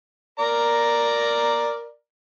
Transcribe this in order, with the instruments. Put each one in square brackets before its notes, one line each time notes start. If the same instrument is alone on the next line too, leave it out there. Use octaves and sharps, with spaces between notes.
[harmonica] A#4 D5 A#5